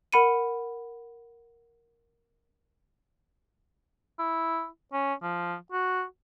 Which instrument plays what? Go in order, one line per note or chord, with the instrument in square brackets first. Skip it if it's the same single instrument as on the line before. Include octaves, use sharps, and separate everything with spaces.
[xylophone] A#4 F#5 B5 C#7 D#7
[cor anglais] E4
C#4
F3
F#4